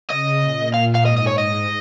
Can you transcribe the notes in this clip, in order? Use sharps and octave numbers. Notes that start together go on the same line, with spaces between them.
C#3 D#5
A#2
F5
F5
G#2 D#5
D#5
C#5
G#2 D#5